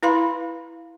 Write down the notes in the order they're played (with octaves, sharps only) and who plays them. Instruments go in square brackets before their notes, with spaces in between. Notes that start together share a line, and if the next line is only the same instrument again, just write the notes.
[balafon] E4 B4 F5 B5 C6